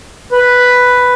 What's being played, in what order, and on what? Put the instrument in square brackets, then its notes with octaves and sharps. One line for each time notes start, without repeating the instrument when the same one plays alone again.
[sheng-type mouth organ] B4